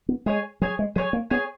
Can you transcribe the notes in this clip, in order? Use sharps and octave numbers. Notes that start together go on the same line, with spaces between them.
B3
G#3 G#4 C#5 G#5
F#3 G#4 C#5 G#5
G#3
F#3 G#4 C#5 G#5
A#3
B3 G#4 C#5 G#5